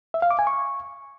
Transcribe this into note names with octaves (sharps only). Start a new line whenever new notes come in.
E5
F5
D6
G#5
C#6